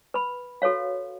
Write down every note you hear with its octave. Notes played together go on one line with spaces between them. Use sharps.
B4 B5
F#4 A4 B4 C#5 F5